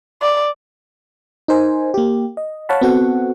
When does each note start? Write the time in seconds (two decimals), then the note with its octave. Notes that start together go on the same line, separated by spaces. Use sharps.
0.22 D5
1.48 D#4 A#4 C5 G#5
1.94 A#3 G4
2.37 D#5
2.69 C#5 F5 F#5 A5 B5
2.81 B3 C4 F#4 A4 F#5